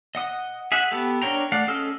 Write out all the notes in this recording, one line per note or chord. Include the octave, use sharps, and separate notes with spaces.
D#5 F#5 D#6
G#4 E5 F#5
B3 G4 A4
D4 A#4 C#5 G5 A#5
A3 D5 F5 F#5
C#4 G#4 A4 D#5 F6